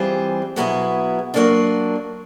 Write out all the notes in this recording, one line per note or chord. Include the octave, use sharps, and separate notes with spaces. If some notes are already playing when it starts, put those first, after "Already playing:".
Already playing: E3 G3 C4 F4 G#4
B2 F#3 B3 E4 G#4
F#3 A#3 D4 F4